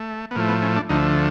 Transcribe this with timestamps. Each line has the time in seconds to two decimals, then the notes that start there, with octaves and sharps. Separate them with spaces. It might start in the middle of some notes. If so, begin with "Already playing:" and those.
Already playing: A3
0.31 B3
0.35 A2 F3 A3 A#3
0.49 B3
0.63 C#4
0.76 D4
0.89 D2 D3 F3 A3 D#4